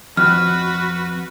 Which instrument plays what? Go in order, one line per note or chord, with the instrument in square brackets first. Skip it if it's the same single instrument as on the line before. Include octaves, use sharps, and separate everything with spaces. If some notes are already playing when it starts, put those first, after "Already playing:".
[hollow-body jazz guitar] F2 [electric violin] F#4 B4 [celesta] F6